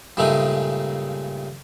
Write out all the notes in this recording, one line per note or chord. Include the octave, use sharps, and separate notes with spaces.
G2 A#2 C#3 G#3 A3 D#4